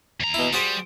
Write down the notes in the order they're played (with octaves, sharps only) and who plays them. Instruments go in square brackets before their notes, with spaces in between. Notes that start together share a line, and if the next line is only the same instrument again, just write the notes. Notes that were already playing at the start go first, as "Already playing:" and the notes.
[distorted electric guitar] D#2 A#5
[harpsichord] B2 E4
[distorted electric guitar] G3 [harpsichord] F#4 G#4 C5